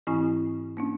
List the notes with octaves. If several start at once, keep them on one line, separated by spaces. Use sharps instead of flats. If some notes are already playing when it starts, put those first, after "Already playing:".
G#2 E3 C4 E4 G#5 C#6
A#3 C#4 D4